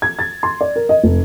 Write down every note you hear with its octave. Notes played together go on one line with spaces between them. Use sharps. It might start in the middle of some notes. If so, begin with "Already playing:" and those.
G#6
A6
C6
D5
A#4
D#5
F1